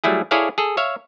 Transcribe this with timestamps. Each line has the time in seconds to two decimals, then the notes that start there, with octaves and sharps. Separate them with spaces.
0.04 F#3 G3 A3 E4 G#4
0.31 E4 G#4 A4 C#5 D5 F5
0.58 G#4 A4
0.77 C#5 E5 F5